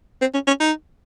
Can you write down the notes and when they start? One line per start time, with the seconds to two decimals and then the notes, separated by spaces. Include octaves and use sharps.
0.21 C4
0.33 C#4
0.47 C#4
0.60 D#4